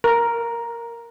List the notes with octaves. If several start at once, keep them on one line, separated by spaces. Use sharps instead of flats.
A#4